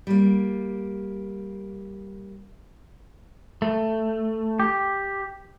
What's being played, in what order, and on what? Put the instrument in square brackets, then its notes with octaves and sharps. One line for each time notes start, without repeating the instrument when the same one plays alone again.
[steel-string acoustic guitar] G3 A#3
[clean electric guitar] A3
G4